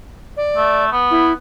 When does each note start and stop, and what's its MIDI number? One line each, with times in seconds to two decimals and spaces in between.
0.37 0.85 74
0.56 0.88 57
0.92 1.31 59
1.11 1.32 64